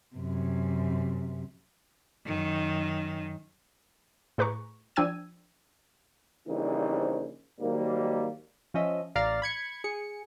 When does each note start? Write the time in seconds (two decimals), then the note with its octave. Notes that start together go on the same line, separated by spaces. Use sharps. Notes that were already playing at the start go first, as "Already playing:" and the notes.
0.16 F#2 C3
2.26 F#2 D#3
4.38 A2 G#4 B4 A#5 C#6
4.96 F3 D4 G5 E6 G#6 D#7
6.48 A#1 C#3 E3 G3 C4 D#4
7.60 G#2 D#3 F#3 G3 A#3
8.74 F3 C#4 D#5 E5
9.15 A1 D5 F5 A#5 F6 A6
9.42 B5 G#6 C#7
9.84 G#4 C#7